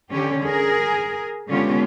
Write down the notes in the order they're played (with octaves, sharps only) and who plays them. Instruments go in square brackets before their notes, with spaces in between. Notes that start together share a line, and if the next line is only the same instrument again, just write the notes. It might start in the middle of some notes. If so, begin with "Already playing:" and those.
[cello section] D3 C#4 G4
G#4 A#4
D3 G#3 B3 C#4 F4 G4